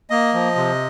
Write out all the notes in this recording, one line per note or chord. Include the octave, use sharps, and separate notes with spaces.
A#3 D#5
F3
C3